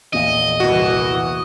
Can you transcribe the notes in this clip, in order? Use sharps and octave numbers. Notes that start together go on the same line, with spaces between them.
A#1 E2 A#2 D#5
C2 E3 F#4